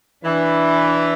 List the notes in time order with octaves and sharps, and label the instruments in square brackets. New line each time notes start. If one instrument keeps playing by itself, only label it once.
[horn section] E3 [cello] D4